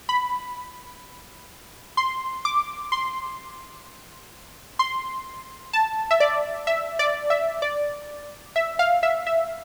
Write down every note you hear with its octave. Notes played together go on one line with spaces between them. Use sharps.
B5
C6
D6
C6
C6
A5
E5
D5
E5
D5
E5
D5
E5
F5
E5
E5